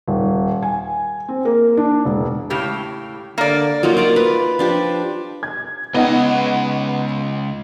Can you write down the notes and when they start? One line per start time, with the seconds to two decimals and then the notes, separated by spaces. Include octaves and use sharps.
0.07 D#1
0.62 G#5
1.28 C4
1.45 A#3
1.77 D4
2.05 E1
2.50 A2 C#3 G4
3.38 D3 A#3 D5
3.83 F#3 A#3 D#4 F4
3.97 F4 D5 A#5
4.16 B4
4.59 F3 D4 G4
5.43 G#6
5.94 C#2 B3 D#4 D#5 F#5